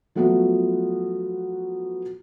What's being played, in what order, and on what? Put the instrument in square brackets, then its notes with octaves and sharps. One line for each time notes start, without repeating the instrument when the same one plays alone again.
[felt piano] F3 F#3 A3 B3 F4 F#4